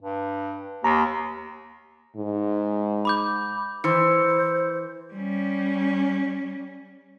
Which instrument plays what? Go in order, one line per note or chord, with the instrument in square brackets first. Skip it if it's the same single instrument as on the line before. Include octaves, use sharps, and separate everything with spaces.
[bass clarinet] G2
[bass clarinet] D#2 [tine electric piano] A#5
[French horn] G#2
[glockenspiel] B5 D6 G6
[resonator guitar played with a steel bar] E3 [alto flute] C5 [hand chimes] C6 E6 C#7
[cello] G3 C#4